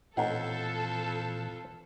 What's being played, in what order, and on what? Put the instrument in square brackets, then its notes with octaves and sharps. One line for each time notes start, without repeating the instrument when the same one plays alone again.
[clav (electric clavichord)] A1 D#4 F#5 [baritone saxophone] F2 [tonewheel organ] A#2 E3 [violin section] A4